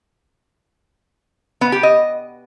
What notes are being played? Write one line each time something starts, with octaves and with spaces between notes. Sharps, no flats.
B3
G4
D#5